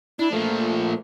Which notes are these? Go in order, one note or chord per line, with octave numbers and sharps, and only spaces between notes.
D4 E4
A#2 F3 A3